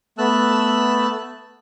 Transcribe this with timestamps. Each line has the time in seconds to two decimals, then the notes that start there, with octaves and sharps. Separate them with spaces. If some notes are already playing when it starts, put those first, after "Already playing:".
0.18 A3 B3 A5 E6 F#6